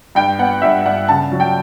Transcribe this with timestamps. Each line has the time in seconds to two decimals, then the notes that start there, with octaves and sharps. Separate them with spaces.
0.15 G2 G5
0.39 B3 F#5
0.62 G2 E5
0.85 G2 F#5
1.08 C#3 A5
1.32 F#3
1.40 G5